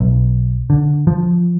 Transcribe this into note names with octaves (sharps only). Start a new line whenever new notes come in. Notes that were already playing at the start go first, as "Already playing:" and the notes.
B1
D3
F3